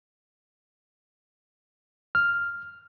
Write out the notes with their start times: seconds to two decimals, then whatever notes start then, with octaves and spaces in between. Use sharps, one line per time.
2.15 F6